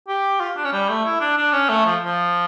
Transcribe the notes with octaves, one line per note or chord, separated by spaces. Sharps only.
G4
F4
D4
C#4
G3
A3
E4
D4
D4
C#4
A3
F3
F3